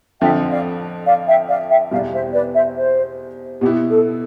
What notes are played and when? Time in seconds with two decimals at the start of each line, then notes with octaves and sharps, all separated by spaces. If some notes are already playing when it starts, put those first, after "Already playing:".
0.21 F2 D3 F3 E5 G5
0.50 D5 F5
1.06 D5 F5
1.28 E5 G5
1.49 D5 F5
1.70 E5 G5
1.91 E2 B2 G3 D5 F5
2.13 C5 E5
2.33 B4 D5
2.55 C5 E5
2.77 C5
3.61 B2 B3 E4 G4
3.90 A4